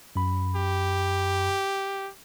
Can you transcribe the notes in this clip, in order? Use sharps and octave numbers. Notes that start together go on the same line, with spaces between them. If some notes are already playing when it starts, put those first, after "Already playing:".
F#2 B5
G4